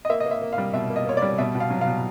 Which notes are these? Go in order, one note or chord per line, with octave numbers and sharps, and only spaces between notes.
D#5
A#3 E5
D#5
A#3
E5
A#3
F5
G3
B2 E5
A#3
D#5
A#3 C#5
D5
G3
B2 E5
B2
F5
F#3
F5
B2